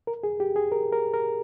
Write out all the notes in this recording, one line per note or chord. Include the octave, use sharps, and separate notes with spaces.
A#4
G#4
G4
G#4
A#4
A#4
A#4